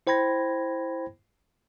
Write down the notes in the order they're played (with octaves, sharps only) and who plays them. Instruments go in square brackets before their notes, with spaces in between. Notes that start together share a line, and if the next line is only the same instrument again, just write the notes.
[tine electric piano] E4 C5 G5 B5 G#6 A#6